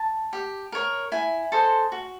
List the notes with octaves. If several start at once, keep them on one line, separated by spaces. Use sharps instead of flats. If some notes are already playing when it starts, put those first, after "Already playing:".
Already playing: A5
G4
A#4 C#5
E4 G#5
A4 C5 D#5
F#4